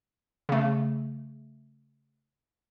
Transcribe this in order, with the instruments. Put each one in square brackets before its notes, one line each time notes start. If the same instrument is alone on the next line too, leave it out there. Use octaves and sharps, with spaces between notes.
[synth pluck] C#3 A3